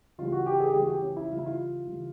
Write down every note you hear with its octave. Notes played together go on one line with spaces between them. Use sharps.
C#3 E3 G3 F4
F#4
G4
G#4
G4
C#3 E3 G3 G#4
F#4
G4
C#4
E4
C#3 E3 G3 F4
E4
F4
C#3 E3 G3